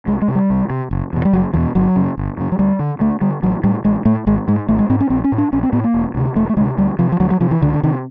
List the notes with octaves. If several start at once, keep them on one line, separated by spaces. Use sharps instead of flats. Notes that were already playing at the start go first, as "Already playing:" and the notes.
C2 G#3
G#3
C3
G3
C2
C3
F#1
E2 B2
G3
F#1 F#3
E2 B2 F3
G1 F#3
F#2 C#3
G1
F#2 C#3
F#3
D2 G3
D3
D2 A3
D3 G3
A1 F#3
A2 G3
A1 G#3
A2 A3
G#1 G#3
G#2 G#3
G#1 A3
G#3
G#2 C4
C#4
A#1 C4
C#4
A2
D4
A#1 C#4
C4
A2 B3
A#3
E1
D2 C3
E1 A3
A3
D2 C3 G#3
D2 G3
C3 F3
F3
D2 F#3
F#3
C3 F3
E3
C#2 D3
D3
C3 D#3